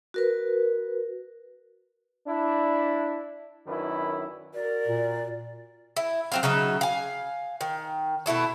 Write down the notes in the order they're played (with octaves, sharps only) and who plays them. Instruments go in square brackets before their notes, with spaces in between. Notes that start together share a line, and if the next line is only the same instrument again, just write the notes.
[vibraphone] F#4 A#4 B4
[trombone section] D4 E4
F#2 D#3 C#4 D4 E4 B4
[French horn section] F#4 A#4 [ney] D5
[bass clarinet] A#2
[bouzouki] E4
F#3 C4 F5
C#3 F#3 D#4 E5
F5 G#5
D#3
B2 A3 E4 A5